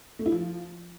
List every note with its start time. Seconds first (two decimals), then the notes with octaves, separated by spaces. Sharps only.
0.19 A3
0.26 E4
0.32 F3